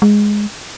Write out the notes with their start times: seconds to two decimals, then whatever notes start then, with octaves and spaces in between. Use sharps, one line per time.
0.02 G#3